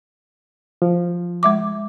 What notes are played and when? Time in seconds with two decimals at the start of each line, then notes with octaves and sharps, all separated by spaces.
0.82 F3
1.43 G#3 E5 D6